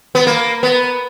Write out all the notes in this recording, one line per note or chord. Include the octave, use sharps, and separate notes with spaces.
B3
A#3
B3